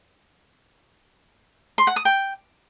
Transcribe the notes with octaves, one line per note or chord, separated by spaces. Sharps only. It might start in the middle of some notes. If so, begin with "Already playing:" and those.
C6
F#5
D#6
G5